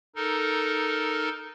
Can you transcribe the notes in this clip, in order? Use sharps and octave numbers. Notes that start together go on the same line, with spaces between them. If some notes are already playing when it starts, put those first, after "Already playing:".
D#4 A4 A#4